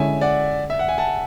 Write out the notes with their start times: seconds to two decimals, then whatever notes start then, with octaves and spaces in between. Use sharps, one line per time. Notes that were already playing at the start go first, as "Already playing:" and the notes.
Already playing: D3 G#3 C#4 E4 G#4 E5 G#5
0.21 D5 F#5
0.70 E5
0.79 F#5
0.88 G#5
0.98 F#5 A5